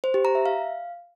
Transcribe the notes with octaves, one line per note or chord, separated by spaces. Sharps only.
C5
G4
A#5
E5
F5